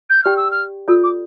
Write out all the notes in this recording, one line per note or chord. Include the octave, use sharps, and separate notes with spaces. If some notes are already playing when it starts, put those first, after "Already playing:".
G6
G4 D5 G5 F6
E6
F6
F4 A4 D5 E6
D6